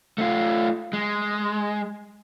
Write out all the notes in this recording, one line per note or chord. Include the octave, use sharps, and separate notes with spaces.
A3 F4
G#3